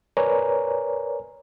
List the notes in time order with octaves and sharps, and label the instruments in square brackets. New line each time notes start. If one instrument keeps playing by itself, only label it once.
[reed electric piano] A#4 B4 C#5 D5 G#5 A#5